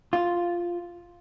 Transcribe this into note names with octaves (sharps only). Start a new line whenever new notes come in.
F4